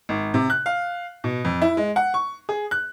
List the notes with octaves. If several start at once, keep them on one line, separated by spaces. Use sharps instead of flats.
G#1
C3
F#6
F5
B2
F2
E4
G#3
F#5
C#6
G#4
F#6